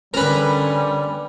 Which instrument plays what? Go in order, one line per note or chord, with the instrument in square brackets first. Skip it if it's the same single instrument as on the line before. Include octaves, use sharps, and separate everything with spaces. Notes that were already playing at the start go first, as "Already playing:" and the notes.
[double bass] D3 C#4 [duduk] G3 [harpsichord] A#4 B4